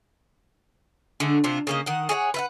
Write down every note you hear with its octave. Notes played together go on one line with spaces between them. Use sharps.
D3 G#3 A3
C3 D4 F4
C#3 A#3 D#5
D#3 F#5
G#4 C#5 D#5 F#5
B4 E5 F#5